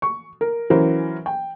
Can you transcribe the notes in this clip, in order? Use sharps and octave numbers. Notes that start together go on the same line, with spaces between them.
C#6
A#4
E3 F#3 C#4 A#4 C5
G5